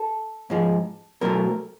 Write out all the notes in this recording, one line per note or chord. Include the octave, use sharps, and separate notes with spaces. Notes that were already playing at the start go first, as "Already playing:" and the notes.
Already playing: A4
G#2 F3 G#3
B2 F#3 A3 A#4